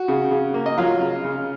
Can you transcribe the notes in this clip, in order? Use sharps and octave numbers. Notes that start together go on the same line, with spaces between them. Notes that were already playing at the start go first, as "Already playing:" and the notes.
Already playing: F#4
C#3
C#3
A#3
D#5
F#3 F4 F5
C#3
C#3